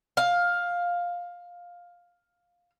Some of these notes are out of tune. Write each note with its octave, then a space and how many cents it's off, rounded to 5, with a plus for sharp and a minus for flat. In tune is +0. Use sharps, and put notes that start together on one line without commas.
F5 +10